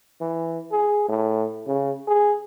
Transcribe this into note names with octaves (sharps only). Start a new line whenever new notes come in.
E3
G#4
A2
C#3
G#4